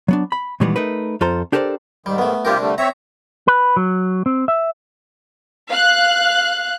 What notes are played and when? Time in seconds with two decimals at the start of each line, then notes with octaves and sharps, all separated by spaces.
0.08 F#3 B3 D4
0.32 B5
0.60 A#2 D#3 E3 G3 G#3 B3
0.76 A3 D#4 A#4 B4
1.21 F2 F4 A4 C5 A#5
1.52 D4 G4 A4 A#4 C5 D5
2.06 G#2 D#3 G3
2.18 A3 B3
2.45 C3 G3 D4 F4 G4 A#4
2.61 D3 G3 A3
2.78 C4 C#5 E5 A#5
3.48 B4
3.77 F#3
4.26 C4
4.48 E5
5.71 F5 F#6